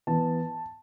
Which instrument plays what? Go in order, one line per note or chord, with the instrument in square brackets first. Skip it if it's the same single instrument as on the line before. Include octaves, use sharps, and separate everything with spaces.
[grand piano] E3 B3 A5